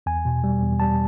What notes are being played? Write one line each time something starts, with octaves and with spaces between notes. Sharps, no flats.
E2 G#5
B2
G3
E2
G3 A5